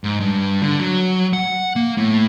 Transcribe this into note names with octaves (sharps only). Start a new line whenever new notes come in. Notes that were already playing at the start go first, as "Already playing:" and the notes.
G#2
G2
D3
F#3
F#5
A#3
A2